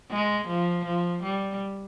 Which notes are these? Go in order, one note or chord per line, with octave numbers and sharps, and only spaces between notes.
G#3
F3
F3
G3